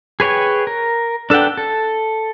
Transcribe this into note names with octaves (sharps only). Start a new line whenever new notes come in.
G#4 B4 C#5 G5 G#5
A#4
D4 A4 B4 F#5 G5
A4